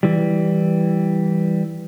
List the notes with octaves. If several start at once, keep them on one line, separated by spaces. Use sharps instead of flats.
E3 G3